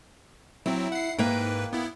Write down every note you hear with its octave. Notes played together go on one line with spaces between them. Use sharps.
F#3 C4 E4
F#5 C7
G#2 A#3 B4 G5
B3 E4